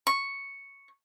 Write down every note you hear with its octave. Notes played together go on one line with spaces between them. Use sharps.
C#6